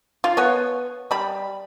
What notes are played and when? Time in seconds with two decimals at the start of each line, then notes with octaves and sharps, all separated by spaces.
0.24 F4
0.37 B3 C#5
1.11 G3 B5